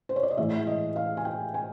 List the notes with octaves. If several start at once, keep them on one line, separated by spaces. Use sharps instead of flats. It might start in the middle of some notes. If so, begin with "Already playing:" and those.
C5
C#5
D5
D#5
A2 E3 G#3 E5
D#5
F5
G#5
G5
G#5